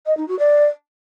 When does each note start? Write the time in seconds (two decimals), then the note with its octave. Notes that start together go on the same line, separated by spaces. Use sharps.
0.06 D#5
0.17 D#4
0.28 F#4
0.39 D5